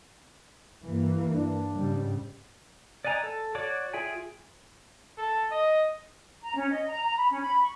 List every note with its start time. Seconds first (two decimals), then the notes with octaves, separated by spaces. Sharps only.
0.84 G2 E3 A#3
1.32 D4
1.73 G#2 C#3 G3
3.05 D5 D#5 F#5 G#5 A#5
3.23 A4
3.55 F#4 C#5 D5 D6
3.93 F4 G#4 E5 G5 G#5
5.18 A4
5.51 D#5
6.42 A#5
6.55 C#4
6.70 D#5
6.88 A#5
7.04 A#5
7.16 B5
7.29 C#4
7.42 B5
7.62 C#6